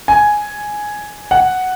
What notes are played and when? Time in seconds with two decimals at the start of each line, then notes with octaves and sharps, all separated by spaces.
0.08 G#5
1.31 F#5